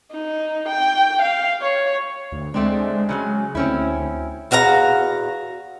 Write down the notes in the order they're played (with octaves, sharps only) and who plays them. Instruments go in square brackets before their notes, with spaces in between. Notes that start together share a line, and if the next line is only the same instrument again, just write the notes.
[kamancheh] D#4
G5
F5
C#5
[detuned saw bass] D2
[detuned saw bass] G#3 [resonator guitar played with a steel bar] A3 C4 D4
[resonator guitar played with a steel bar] C#3 F#3 G#4
[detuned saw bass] D2 [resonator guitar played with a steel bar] C4 C#4 E4
[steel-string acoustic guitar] E2 F#4 F5 F#5 A#5